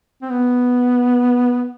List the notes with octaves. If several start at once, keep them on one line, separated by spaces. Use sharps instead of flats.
C4
B3